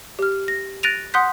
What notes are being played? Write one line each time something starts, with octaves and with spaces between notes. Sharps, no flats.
G4 F6
A#6
F#6 A6 A#6 D7 D#7 F7
F#5 C6 D#6 F#6 G6 B6